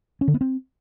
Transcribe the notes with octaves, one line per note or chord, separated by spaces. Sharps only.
C#4
D3
B3
C4